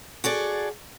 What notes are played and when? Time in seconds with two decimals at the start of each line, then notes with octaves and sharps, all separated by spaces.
0.24 F#4 G#4 A4 D5